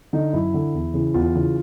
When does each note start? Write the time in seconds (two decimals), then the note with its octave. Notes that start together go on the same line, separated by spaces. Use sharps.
0.13 D3 D#4
0.33 F#2 E4
0.54 D3
0.74 E2
0.94 C#3 E3
1.14 E2 F4
1.35 C#3 E3